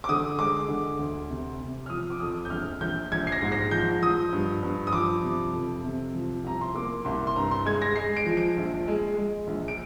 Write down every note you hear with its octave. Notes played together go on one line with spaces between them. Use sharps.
D6
D3 D#6
G#3 D6
D3
D2
C3
C3
F6
F3 D#6
D6
F2 D#6
G6
A#1 F6
A#1 G6
A#1 G#6
C7
A#6
G#2
A#6
F3 G6
F3 D#6
G2
G2
D#6
F3 D6
C3
F2
C3
F3
C2 A#5
C6
A#3 D6
C2 C6
C6
G2 A#5
C6
G#3 G#6
A#6
G#3 C7
D7
F3
D7
A#1
G#3
G#3
A#1
D7